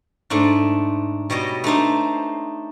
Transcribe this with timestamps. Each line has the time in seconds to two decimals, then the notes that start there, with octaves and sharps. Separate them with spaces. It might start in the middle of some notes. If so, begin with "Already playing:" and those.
0.30 G#2 A3 D4
1.30 B2 G3 C#5 D#5
1.64 A3 D4 D#4 C5